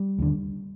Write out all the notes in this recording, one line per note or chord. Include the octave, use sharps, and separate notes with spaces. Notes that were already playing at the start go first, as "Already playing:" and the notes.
Already playing: G3
D#2 D3